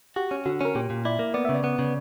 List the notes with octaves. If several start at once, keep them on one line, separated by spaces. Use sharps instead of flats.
F#4 G4
C#4
D3 F#4
C#4 A#4
A#2 G4
A#2
E4 D5
A#3
B3 D5
C#3 E5
D5
B3
C#3